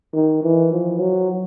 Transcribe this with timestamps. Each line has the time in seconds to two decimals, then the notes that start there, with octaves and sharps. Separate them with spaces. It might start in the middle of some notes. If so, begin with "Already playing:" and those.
0.14 D#3
0.43 E3
0.72 F3
0.99 F#3